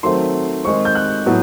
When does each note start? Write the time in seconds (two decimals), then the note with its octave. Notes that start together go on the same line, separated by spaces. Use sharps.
0.03 D#3 F#3 A3 C4 C6
0.65 D#3 G#3 C4 C#6
0.85 G6
0.95 F#6
1.26 A2 F#3 B3